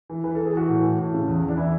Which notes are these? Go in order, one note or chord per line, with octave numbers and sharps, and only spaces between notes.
E3
E3 B4
A4
E3
G#4
E3 F#4
A2
E3
A2
C#3
E2
E2
D4
E3 E4